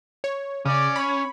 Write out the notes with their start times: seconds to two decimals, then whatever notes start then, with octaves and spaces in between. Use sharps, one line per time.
0.24 C#5
0.65 C#3 C#4 D5
0.96 C#5 B5